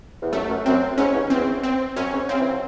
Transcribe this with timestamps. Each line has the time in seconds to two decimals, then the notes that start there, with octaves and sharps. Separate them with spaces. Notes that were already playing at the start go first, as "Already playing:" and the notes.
0.22 E2
0.33 F#2 A3
0.49 F#2
0.66 F#2 C4
0.98 G#2 C#4
1.14 E2
1.30 E2 C4
1.63 C4
1.96 F#2 C#4
2.13 G#2
2.29 C#3 C4
2.39 E3
2.51 F#3